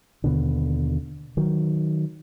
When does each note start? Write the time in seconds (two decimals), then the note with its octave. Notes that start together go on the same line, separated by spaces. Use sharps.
0.24 D#2 B2 D3
1.37 D#3 F#3